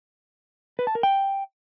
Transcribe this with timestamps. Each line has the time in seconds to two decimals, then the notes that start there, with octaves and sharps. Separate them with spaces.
0.79 B4
0.87 A5
0.95 A#4
1.03 G5